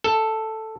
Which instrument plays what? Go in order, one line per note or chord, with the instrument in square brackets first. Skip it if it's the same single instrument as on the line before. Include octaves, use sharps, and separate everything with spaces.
[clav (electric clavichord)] A4